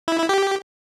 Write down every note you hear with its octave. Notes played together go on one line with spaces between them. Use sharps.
E4
E4
G4